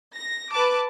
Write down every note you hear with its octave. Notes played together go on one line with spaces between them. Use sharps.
A#6
B4 A5 D6